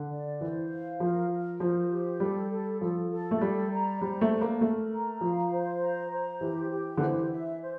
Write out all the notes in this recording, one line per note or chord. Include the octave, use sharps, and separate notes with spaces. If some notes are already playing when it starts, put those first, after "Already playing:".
Already playing: D3
D5
E3 C5
F5
F3 A#4
A#4
F3 C5
G4
G3 A4
A4
F3 A4
A4
A3
G3 D5
A#5
G3 C5
A3
D4
A#3
A3 A#4
A#5
F3 F5
C5
A#5
C5
E3 G4
G4
D3
E3 C5
E5
C5